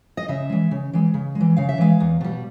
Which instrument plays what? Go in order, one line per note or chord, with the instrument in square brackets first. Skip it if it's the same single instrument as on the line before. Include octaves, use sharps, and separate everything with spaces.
[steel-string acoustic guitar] D#5
C#3 E5
E3 G#3
C#3
E3 G#3
C#3
G#3
E3
C#3 F5
E5
E3 G#3 F5
E2
B2 G3